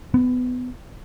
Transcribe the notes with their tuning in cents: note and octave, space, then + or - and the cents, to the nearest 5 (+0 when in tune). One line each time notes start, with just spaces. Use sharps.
B3 +20